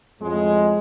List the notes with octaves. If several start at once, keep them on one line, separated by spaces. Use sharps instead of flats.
F2 A2 G#3